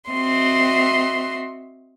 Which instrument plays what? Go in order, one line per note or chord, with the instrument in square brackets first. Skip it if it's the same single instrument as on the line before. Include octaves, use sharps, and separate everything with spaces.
[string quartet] C4 F#4 D#5 E5 C6